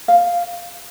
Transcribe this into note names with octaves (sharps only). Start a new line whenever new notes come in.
F5